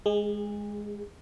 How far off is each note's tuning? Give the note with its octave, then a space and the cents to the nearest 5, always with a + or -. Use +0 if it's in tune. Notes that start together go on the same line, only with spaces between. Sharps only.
G#3 +0 G#4 -35